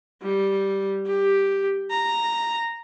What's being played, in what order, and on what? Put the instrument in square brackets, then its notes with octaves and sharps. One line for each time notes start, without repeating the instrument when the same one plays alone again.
[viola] G3
G4
A#5